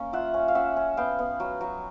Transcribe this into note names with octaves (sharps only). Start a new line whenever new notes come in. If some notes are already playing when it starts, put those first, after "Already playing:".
Already playing: A#3 C#4
F4 E5 F#5
C#4
F5
C#4 E5 F#5
C#4
B3 F5 G5
B3
F#3
F#3